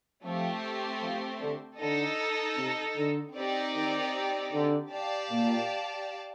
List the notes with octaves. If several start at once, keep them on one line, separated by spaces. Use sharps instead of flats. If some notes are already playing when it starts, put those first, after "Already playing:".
F3 A3 C4 G4 C5
F3
D3
D3 D#4 A4 D#5
C3
D3
C4 D#4 G4 D5
D#3
D3
G4 D5 F5 A5
A#2